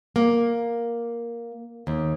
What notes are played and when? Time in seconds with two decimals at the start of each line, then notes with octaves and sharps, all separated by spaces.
0.16 A#3
1.87 D#2